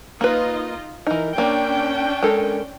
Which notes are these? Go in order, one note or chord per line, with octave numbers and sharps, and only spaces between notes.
A#3 D#4 F4 B4 D#5
E3 D#4 A#4
A#3 C#4 D4 G5
G#3 A4 A#4